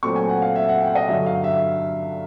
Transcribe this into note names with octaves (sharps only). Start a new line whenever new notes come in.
A#2 F#3 A3 C4 C#6
G#5
F#5
F5
E5
F#5
G5
D#5
G2 D3 F#3 E5
F5
E5